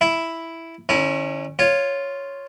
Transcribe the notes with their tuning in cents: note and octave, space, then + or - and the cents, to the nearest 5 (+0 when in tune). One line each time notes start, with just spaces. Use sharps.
E4 +0 E5 +0
D3 +30 C#4 -20 E4 -15
F4 +0 C#5 +0